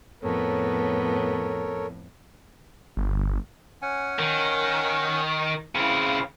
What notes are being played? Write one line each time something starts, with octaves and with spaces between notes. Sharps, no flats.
F2 A2 B3 A4 A#4 C#5
G1
C#4 F#5 G#5
D#3
C#3 C4 E4 F5